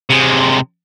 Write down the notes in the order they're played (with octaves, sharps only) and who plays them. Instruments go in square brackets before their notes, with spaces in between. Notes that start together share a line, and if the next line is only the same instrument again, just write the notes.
[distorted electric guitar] C3 G#3